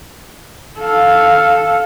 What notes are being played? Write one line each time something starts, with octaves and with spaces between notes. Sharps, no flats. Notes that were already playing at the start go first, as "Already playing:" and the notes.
A4 F5